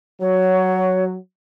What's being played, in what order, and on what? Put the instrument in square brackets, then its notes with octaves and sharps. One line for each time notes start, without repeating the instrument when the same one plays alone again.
[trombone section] F#3 [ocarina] C#5